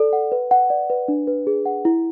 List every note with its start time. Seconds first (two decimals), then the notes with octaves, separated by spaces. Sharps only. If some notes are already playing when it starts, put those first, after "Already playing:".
Already playing: A4 D5
0.13 F#5
0.32 B4
0.51 F#5
0.70 D5
0.90 B4
1.08 D4
1.27 B4
1.47 G#4
1.66 F#5
1.85 E4